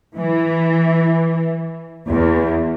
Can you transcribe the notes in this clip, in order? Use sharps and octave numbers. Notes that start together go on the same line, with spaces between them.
E3
E2